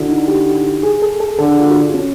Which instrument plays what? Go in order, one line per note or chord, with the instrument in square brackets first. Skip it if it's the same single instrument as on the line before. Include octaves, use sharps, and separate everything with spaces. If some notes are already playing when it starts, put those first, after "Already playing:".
Already playing: [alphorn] D3 [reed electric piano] E4 F#4
[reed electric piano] D#4
G4
G#4
A4
A4
[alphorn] D3 [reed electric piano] A4
[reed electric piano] F4
F#4
C#4